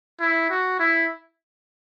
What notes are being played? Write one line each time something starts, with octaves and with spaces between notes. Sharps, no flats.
E4
F#4
E4